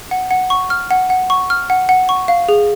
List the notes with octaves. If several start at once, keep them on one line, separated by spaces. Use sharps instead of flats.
F#5
F#5
C#6
F6
F#5
F#5
C#6
F6
F#5
F#5
C#6
F5
G#4